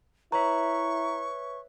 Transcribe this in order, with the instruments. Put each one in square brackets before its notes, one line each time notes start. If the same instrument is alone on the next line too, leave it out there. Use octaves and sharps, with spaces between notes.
[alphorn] E4 [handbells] B4 C#5 E5 [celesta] A#5 [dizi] C#6